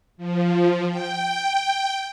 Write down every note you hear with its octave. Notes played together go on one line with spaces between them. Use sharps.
F3
G5